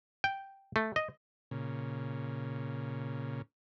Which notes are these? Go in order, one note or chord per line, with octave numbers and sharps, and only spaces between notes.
G5
A3
D#5
A#2 C#3